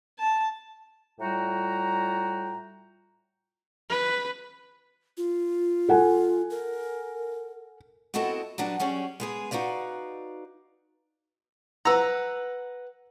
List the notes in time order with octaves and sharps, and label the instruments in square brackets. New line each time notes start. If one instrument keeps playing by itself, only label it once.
[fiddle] A5
[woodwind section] A2 G3 F4 F#4 G5 A#5
[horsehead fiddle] B4
[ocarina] F4
[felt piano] A4 F#5 G#5
[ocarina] A#4
[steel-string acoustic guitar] B3 C4 E4 F#4 A4 D#5
F#3 G3 B3 D4
F#3 G3 C#4 G#4
G#3 B3 G#4
D#4 F#4 B4 D5 F5
[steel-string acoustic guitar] B4 F#5 [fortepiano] A#5 E6